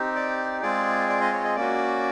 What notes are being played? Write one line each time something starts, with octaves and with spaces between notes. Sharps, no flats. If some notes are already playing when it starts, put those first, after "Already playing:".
Already playing: C4 D#4 G4
D5
G#3 C4 F4 G#4 D5
D5
D#5
C#5
D#5
A#3 C#4 F#4 D5